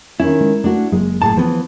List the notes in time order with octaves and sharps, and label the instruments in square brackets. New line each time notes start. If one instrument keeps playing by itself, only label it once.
[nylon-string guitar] D#3 C#4 [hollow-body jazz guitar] E4
[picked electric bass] G#3
[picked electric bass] A3 [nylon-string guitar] D4 F#4
[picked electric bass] F#1 F#3 A#3 [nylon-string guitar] G#3
[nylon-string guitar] A2 [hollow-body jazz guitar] G#4 A5
[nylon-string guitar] E3 [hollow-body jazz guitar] F3 B3